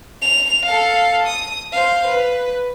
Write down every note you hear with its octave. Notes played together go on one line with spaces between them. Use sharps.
F7
A4 F5
D#6
C5 F5
B4